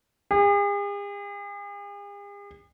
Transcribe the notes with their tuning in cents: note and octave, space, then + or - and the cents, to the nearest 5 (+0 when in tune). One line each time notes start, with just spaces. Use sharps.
G#4 -45